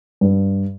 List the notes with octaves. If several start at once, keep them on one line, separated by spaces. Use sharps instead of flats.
G2